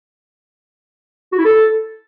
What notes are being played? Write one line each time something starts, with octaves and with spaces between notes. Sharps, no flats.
F#4
E4
A4